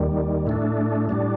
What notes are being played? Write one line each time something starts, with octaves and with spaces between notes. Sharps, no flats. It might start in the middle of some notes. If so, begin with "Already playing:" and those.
Already playing: D#2 D#3 G3
A2 A3 D4
A2 G3 D4